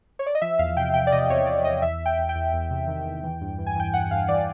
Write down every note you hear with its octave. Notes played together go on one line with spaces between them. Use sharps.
C#5
D5
D#5
F3 E5
E2 F5
C3 G5
C3 G5
D5
C3 D#5
E2 C#5
C3 D5
E2 D#5
E2 E5
E2
G5
E2
G5
E2
E2
C3
D#3
E2
E3
G2
E3
G#5
E3 G5
G2 F#5
G2 F5
E3 D5